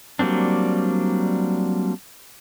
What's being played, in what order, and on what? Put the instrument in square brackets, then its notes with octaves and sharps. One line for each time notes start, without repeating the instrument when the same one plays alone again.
[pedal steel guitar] F#3 G3 A#3 C4 D4